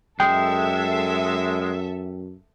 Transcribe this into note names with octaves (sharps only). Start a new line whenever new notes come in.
F#2 G#3 A4 E5 G5